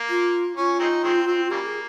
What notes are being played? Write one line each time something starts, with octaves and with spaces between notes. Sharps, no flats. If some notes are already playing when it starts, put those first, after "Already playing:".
Already playing: A#3
F4
C#4 F4
G#3 C4 D#4
D#3 G#3 C4
C4
C#3 G3 A#3 G4
G#4